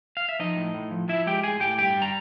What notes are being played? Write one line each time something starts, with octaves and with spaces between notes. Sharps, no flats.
F5
E5
F3 D#4 D#5
A2
A2
F3
F3 E4 E5
G#3 G4 G5
A2 G#4 G#5
A2 G4 G5
G2 G4 G5
G3
A#5